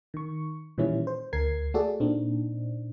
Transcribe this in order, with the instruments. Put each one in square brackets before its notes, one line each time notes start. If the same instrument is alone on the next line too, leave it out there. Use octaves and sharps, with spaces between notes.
[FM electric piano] D#3 C#6
A#2 D#3 E3 G3 C#4 E4
C5
D2 A#4 G#6 C7
A3 F#4 G#4 A4 D5
A#2 C4 D4 D#4